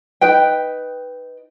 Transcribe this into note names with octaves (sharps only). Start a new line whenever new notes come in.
D#4 B4 G5